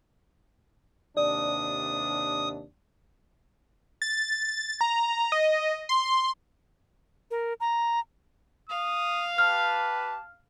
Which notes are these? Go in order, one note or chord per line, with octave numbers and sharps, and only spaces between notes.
D#2 C3 D4 D5 D#6
A6
A#5
D#5
C6
A#4
A#5
F5 D#6
G4 B4 A5 F6